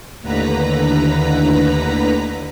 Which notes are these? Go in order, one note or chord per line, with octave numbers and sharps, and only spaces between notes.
D#2 A2 D3 B4 A#5 B6